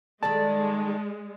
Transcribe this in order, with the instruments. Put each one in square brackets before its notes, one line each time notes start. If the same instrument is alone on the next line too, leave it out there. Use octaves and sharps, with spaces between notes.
[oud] D#3 G3 A4 [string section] G#3 [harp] D5 [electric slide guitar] A5